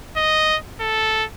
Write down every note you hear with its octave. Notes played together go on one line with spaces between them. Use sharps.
D#5
A4